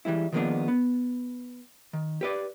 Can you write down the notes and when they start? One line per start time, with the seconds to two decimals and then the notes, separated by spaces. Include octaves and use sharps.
0.05 E3 G3 G#3 E4
0.32 D#3 F3 G#3 A#3 B3 D4
0.68 B3
1.93 D#3
2.21 G4 B4 D5